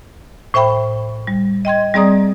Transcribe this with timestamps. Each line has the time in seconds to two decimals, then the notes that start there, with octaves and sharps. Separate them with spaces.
0.54 A2 C5 E5 G5 B5
1.27 G3
1.65 D#5 G5 C6 G#6
1.94 G3 C4 G#4 D5 A#5 D#6